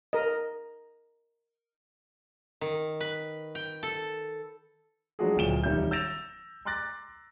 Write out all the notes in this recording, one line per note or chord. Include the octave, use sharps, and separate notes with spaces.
A#4 D#5
D#3
B4
G5
A4
F3 F#3 G#3 D4 F#4 G#4
D1 A#2 G5 E7 G7
E1 D#3 G3 C#4 E5 G6
E6 G6 A6 A#6 E7 F7
A#5 C6 D6 F#6 A6 A#6